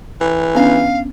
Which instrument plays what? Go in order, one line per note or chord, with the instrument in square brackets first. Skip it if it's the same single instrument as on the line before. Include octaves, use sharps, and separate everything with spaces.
[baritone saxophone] E3
[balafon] B3 C#4 D4 [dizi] F5